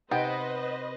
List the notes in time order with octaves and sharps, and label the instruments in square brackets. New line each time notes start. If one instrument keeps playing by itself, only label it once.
[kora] C3 [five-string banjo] B3 [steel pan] D#4 G5 [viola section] B4 C5 D#5